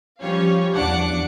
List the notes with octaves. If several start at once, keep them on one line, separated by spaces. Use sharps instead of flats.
F3 G3 C#4 G4 C#5 F5
E2 D4 F#5 D6 C#7